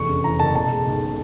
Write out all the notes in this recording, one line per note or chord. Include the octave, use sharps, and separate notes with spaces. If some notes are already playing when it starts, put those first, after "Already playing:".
Already playing: F1 E2 C#6
C#3
E3 A#5
F#1 A5
B2 A5
G#3
B1